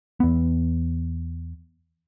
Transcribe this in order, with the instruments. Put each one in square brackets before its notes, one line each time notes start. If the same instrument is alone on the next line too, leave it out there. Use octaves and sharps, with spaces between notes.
[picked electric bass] E2 B3